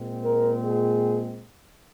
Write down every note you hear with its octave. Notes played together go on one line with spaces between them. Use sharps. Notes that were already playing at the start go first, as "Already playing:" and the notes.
Already playing: A#2 G#3 C4
A#4
G#4